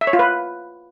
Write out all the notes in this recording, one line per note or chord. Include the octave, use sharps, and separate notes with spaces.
E5
C#5
F4
B4